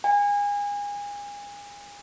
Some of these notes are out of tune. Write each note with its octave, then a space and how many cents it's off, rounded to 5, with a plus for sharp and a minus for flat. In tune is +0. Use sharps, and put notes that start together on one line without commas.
G#5 -30